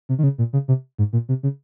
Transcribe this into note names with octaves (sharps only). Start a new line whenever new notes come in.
C3
D#3
C#3
A#2
C#3
C3
G#2
A#2
C3
C#3